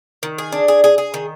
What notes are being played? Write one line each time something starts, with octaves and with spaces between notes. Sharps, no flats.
D#3
G#4
D4
G#4
G#4
G#4
D#3